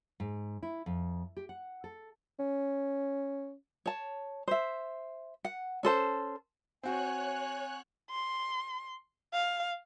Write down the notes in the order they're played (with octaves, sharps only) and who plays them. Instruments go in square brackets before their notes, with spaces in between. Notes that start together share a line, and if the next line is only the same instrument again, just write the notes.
[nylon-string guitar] G#2
E4
F2
G4
F#5
A4
[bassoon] C#4
[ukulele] C#5 A5
C5 E5
F#5
C#4 A4 C5 A5
[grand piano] C4 F#4 [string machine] C#5 F#6 [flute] G#5
[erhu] C6
F5